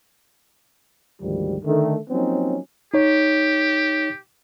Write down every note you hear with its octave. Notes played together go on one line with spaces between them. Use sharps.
D2 G#2 D#3 F3 G3
D3 D#3 A3
F3 F#3 A#3 C4 C#4 D#4
D#4 G4 C#5